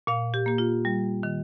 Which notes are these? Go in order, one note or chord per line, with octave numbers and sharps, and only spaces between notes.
A#2 F5
G4
A#3 G4
F4
G3
D#3